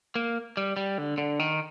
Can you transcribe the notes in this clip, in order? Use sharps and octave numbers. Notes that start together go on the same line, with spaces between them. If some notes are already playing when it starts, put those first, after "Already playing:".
A#3
G3
G3
D3
D3
D#3